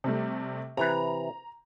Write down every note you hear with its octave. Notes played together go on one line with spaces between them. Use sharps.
C3 G3 A3
C3 E3 B4 A#5